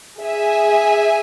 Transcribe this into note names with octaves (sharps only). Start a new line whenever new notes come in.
G#4 E5 G#5